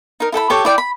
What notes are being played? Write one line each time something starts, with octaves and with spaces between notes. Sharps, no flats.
D#4 A#4
E4 A4 G5 B5
G4 A4 C#5
E4 D5 G5
B5